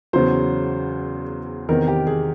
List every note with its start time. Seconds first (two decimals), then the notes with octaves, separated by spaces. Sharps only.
0.13 E2 C#3 F#3 C5
1.69 E2 C3 D#3 A#4
1.88 G4
2.07 G#4